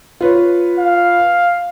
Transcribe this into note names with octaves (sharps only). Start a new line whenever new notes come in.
F4 B4 C#5
F5